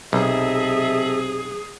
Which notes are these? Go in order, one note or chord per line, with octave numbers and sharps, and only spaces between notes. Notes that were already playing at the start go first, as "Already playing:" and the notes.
B1 C3 G#4 A4 D#5 E5